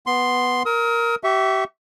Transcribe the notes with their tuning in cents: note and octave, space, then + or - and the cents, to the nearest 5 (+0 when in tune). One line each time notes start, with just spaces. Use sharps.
B3 +0 C6 +0
A#4 +0 D#6 +40
G4 -35 E5 -5 C#6 +0